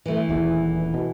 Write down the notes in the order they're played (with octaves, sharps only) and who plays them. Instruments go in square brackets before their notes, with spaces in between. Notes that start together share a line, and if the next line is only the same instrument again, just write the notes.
[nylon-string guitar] E3 A3
[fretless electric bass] D#1 E2
B2